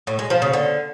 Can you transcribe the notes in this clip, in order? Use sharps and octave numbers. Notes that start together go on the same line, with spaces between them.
A2
G#3
F3
C#3
D3